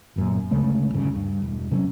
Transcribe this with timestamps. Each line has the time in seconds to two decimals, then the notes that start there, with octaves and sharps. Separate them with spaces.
0.16 G1 F#2 A#2
0.51 D2 C#3 G#3 A3
0.94 D1 D2 G2 C#3
1.16 G2
1.42 E1
1.71 C3 F#3 A3 C#4